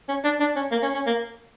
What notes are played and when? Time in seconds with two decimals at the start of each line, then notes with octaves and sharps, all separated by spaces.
0.09 C#4
0.24 D4
0.40 D4
0.56 C#4
0.71 A#3
0.82 C#4
0.94 C#4
1.06 A#3